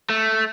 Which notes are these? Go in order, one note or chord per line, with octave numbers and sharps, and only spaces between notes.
A3